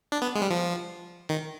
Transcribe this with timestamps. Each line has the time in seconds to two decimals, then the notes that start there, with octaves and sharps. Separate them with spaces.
0.12 D4
0.22 B3
0.35 G#3
0.42 G3
0.50 F3
1.29 D#3